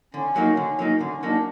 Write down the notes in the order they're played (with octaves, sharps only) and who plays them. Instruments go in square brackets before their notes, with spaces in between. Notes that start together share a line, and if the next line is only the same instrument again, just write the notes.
[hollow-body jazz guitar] D3 [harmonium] C#4
[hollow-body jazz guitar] F#3 A#3 D#4
D3
F#3 A#3 D#4
[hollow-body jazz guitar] D3 [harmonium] C#4
[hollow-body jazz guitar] F#3 A#3 D#4 [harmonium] D4